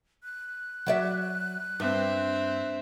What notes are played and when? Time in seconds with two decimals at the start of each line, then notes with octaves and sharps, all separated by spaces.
0.24 F#6
0.87 F#3 D5 E5
1.80 G2 C4 E5